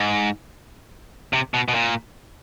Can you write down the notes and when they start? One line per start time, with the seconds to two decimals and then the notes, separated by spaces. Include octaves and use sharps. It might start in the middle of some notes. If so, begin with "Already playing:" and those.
Already playing: G#2
1.33 C3
1.54 B2
1.68 B2
1.74 A#2